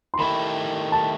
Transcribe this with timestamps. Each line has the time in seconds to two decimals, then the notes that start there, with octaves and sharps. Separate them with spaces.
0.14 C6
0.19 D#3 A3 E4 G4 B5
0.92 A5